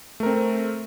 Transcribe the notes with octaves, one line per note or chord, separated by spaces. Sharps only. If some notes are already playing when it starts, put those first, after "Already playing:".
A3 C4 A#4